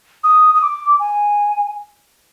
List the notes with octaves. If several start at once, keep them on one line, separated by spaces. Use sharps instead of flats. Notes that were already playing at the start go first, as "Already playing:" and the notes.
D#6
D#6
D6
G#5